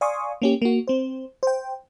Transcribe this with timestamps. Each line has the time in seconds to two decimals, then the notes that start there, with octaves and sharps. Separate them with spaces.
0.01 D5 F5 G#5 C6 C#6 D#6
0.42 A#3 C#4 G4
0.62 A#3 F#4
0.88 C4 C5
1.43 C5 G5